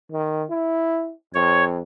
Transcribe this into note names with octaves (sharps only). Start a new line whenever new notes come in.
D#3
E4
F2 C#5